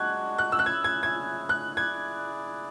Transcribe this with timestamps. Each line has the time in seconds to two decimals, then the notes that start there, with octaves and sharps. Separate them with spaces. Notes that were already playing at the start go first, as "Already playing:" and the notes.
Already playing: G#3 D4 F#4 F#6 G#6
0.38 F#6
0.52 E6
0.59 F#6
0.66 C#4 E4 G#4 G#6
0.84 G#6
1.03 G#6
1.49 F#6
1.76 E4 G#4 D5 G#6